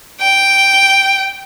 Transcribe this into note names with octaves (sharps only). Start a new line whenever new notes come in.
G5